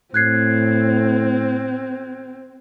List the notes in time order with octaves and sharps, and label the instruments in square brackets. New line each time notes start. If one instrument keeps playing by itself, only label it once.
[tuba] A2 [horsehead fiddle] C4 [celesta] F#6 G#6 C7